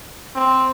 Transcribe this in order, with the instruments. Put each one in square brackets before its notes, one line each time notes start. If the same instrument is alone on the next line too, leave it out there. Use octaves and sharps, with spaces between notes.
[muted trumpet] C4